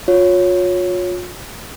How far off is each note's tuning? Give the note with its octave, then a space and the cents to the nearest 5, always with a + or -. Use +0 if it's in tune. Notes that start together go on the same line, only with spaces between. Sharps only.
F4 +40 C#5 +0